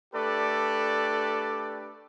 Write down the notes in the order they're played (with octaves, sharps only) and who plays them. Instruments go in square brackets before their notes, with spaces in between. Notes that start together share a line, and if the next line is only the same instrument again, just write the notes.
[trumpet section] A3 D4 G4 A4 B4 D5